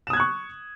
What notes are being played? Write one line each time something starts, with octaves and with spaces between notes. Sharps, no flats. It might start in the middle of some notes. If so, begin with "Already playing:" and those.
C#6 D#6 F#6 G#6 E7